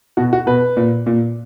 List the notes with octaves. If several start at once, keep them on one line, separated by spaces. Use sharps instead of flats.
B2 F#4
F#4
B2 B4
A#2
A#2